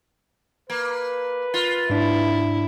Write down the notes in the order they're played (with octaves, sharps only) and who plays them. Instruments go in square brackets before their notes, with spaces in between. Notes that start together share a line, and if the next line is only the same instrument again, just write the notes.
[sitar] A#3 [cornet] B4
[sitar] F4
[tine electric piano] G#2 D4 [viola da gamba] E4